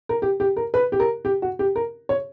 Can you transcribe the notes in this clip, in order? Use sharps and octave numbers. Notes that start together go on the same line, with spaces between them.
A#4
G4
G4
A#4
B4
G4
A#4
G4
F#4
G4
A#4
C#5